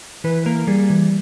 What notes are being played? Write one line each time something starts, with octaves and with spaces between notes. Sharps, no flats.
E3 B4
A#3 A#4
G3 G#4
E3